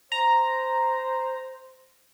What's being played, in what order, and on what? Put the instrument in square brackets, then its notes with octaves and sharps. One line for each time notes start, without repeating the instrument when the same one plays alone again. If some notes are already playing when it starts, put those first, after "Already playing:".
[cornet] C5 [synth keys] A#5